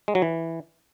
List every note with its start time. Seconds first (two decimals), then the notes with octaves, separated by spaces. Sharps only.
0.08 G#3
0.15 F#3
0.22 E3